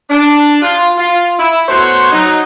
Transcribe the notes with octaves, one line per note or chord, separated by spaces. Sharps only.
D4
F4
F4
E4
A3 B3 F#4 C5 C#5 C6
F#3 D#4